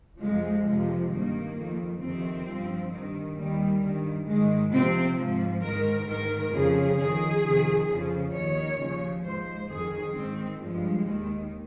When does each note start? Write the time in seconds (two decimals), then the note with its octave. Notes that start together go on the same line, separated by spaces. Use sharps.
0.20 F2 C3 F3 G#3
0.65 F2 C3 F3 G#3
1.10 G2 D#3 A#3
1.56 F2 D#3
2.00 F2 C3 D#3 C4
2.46 G2 F3
2.91 G2 D#3
3.36 D#2 D#3 G3
3.82 G2 D#3
4.26 G#2 D#3 G#3
4.72 F2 C3 F3 C4
5.17 G#2 F3
5.62 G#2 D#3 A#4
6.08 G#2 D#3 A#4
6.53 F2 C#3 F3 G#4
6.98 F2 D#3 G#4
7.43 F2 C3 D#3
7.88 F2 C#3 F3
8.33 D#2 D#3 C#5
8.79 D#2 C#3 F3
9.24 G#2 F3 C5
9.69 F2 D#3 G#4
10.14 G#2 D#3 C4
10.60 G2 F3 G#3
11.05 D#2 D#3